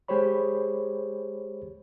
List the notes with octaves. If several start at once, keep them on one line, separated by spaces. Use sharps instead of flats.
G#3 G4 G#4 C5 C#5 B5